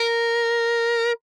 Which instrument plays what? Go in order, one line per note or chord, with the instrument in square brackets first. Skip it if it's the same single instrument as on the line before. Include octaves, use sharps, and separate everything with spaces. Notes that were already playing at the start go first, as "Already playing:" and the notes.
Already playing: [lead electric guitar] A#4